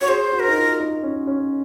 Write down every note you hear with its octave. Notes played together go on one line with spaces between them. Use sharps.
F#4 C#5
G#4 C5
F#4
A#4
D#4
F4
D#4
C#4
C#4